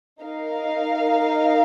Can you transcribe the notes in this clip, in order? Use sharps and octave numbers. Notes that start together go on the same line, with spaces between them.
D#4 A#4 F5